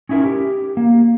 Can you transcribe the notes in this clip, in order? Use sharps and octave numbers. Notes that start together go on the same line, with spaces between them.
C#4 D#4 E4 F#4 A#4
G4
A#3